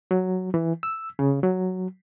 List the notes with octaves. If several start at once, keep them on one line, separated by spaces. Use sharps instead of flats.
F#3
E3
E6
C#3
F#3